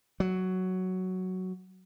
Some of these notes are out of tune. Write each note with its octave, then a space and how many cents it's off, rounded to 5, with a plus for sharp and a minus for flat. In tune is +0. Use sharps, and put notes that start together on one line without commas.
F#3 +5